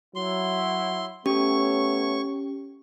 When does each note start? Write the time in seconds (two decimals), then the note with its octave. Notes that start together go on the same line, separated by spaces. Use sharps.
0.16 F#3 E4 C6
1.26 A3 B3 C#4 G4 C#5 C#6